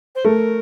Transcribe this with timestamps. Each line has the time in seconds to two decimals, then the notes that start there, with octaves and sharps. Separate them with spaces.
0.15 C5
0.24 A3 A#4